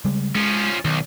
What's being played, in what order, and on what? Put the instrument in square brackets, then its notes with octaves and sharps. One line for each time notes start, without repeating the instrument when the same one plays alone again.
[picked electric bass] C#3 G3 G#3
[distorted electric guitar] F3 C#4 [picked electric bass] G#3
[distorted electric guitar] B1 [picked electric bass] D#3